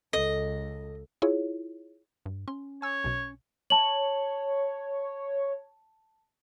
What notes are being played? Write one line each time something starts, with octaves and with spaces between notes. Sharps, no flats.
C#2 A4 D#5
E4 F4 G#4 C#5
G2
C#4 C6
C#5 G#5 E6
B1 B2
C#5 A5 F#7